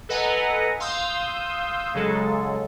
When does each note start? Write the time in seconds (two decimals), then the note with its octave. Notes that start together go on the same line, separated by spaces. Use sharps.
0.09 A4 B4 D#5 F#5 G#5 A#5
0.80 F5 C6 D#6 E6 G6
1.94 C#3 F#3 G#3 A4